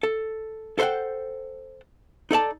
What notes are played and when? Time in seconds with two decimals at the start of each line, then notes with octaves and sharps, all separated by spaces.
0.03 A4
0.79 A4 C5 E5 F#5 G5
2.31 D#4 A4 D5 A5